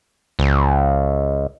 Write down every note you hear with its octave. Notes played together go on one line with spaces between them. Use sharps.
C#2